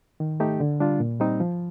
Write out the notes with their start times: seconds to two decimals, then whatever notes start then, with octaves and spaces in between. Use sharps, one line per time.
0.20 D#3
0.40 A3 D#4 G4
0.60 D3
0.80 G3 D4 F4
1.00 A#2
1.20 G3 C4 D#4
1.40 F3